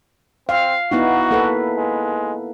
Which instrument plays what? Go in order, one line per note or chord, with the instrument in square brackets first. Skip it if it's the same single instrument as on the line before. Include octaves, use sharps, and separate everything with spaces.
[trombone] C4 [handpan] F5
[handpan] B3 D#4 E4 [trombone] F#4
[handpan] A#3 A4 B4
[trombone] G#3